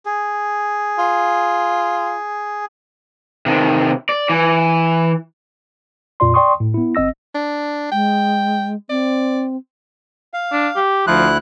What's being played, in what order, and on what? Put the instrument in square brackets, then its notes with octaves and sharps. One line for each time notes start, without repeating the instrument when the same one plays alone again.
[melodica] G#4
[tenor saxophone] F4
[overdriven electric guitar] C3 D#3
D5
E3
[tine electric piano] F2 A#2 F4 D5 C6
D5 G5 C6 C#6 D#6
A2
B3 E4
G1 C4 D#5 E6 A#6
[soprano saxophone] D4
[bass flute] G#3 [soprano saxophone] G5
[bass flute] C4 [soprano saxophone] D5
[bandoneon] F5
[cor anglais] D4
G4
[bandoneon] D2 E4 F#6 [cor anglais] F3